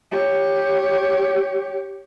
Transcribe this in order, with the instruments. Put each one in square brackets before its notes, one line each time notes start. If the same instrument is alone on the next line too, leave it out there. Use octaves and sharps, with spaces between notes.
[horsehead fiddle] G4 C#5